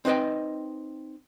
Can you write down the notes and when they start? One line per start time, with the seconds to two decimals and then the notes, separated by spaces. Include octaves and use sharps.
0.05 C4 D#4 B4 D#5 G5